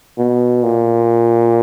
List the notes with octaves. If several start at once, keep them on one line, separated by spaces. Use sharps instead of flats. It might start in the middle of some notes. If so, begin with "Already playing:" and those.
B2
A#2